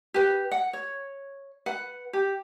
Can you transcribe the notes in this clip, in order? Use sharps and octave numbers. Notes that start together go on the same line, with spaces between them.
G4 B4
F#5
C#5
B4 F#5
G4